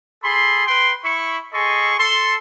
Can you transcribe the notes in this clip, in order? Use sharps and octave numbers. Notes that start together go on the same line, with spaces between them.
G#4 A4 B5 C6
B4 G5 C6
E4 B5 C#6
G#4 A4 D#5 C6 C#6
A4 C6